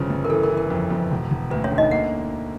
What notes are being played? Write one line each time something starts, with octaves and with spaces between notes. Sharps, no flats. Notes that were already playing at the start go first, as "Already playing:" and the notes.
Already playing: G1 C#3 F3
G1
A#4
E3 A4
A#4
E3
A#4
F2
F2
E1
E1
D2 B4
C#4 C#5
D3
D#4 D#5
A#3 F#5